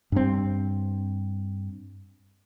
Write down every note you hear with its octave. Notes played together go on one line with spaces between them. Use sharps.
G2 C4